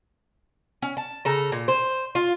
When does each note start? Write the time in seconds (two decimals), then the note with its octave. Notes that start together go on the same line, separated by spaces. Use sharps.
0.82 C#4
0.97 A5
1.25 C#3 A4 A#5
1.52 A#2
1.68 C5
2.15 F4